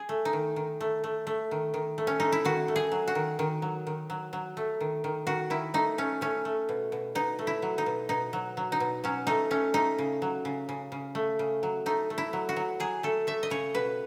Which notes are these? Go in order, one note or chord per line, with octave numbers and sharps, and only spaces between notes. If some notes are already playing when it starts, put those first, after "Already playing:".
Already playing: G#4
A3
D#4
D#3
D#3
A3
A3
A3
D#3
D#3
A3
C#4
A3 D#4
E4
D#3 F#4
A3
G#4
F#3
F#4
D#3
D#3
F#3
D#3
F#3
F#3
A3
D#3
D#3
D#3 F#4
D#3 E4
A3 D#4
A3 C#4
A3 C#4
A3
B2
B2
B2 D#4
A3
E4
F#3
D#4
B2
B2 D#4
F#3
F#3
D#4
B2
F#3 C#4
A3 D#4
A3 C#4
A3 D#4
C#3
F#3
C#3
C#3
C#3
A3
C#3
F#3
A3 D#4
A3
E4
F#3
F#4
F#3
F#3 G#4
A3 A4
A3 E5
D#5
C#3 C#5
B2 B4